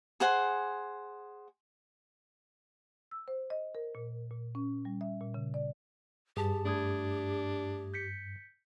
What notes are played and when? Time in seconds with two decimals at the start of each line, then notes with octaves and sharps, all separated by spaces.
0.20 G#4 C5 F#5 G#5
3.11 E6
3.28 C5
3.50 D#5
3.75 A#4
3.95 A#2
4.31 A#2
4.55 C#4
4.85 G3
5.01 E5
5.21 A#2
5.34 C#3
5.54 D5
6.37 G2 G4 G#4 A5
6.65 A3 D4 D#6 G#6
7.94 G6 B6 C#7